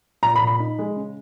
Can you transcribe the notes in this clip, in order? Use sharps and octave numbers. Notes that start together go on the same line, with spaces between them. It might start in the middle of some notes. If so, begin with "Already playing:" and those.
A#2 A#5
B5
A#2
B5
D#4
G#3
C#3